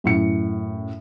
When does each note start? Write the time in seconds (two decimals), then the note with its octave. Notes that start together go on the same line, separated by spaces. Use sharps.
0.04 F#2 A2 C#7